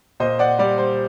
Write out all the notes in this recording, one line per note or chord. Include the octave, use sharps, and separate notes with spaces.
A#2 C5 D#5
D5 F#5
G3 D5
C5